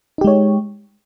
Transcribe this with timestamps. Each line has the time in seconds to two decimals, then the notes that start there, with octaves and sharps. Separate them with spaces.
0.18 D#4
0.21 G4
0.24 G#3
0.27 C#5